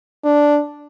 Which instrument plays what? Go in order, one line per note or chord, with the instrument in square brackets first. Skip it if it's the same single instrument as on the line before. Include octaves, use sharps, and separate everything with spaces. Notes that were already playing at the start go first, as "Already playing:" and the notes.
[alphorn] D4